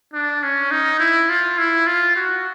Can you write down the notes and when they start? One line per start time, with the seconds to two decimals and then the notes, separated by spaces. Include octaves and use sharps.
0.13 D4
0.43 C#4
0.71 D#4
1.00 E4
1.30 F4
1.58 E4
1.87 F4
2.16 F#4